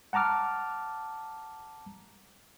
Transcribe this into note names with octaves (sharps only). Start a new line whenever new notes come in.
F#5 A5 A#5 D6 F6